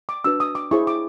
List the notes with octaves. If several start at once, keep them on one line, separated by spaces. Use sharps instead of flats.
D6
D4 F#4 B4 E6
D#6
D6
E4 G#4 C5 C#6
D6